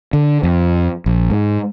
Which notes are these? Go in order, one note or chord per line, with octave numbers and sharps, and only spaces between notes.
D3
F2
A#1
G#2